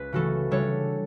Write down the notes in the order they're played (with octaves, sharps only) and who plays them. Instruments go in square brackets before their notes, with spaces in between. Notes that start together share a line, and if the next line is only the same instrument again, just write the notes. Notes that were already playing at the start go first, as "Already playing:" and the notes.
Already playing: [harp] C#2 C#4 B4
C#3 E3 A3 E4 F#4 A4
C#3 G3 D4 A4 C#5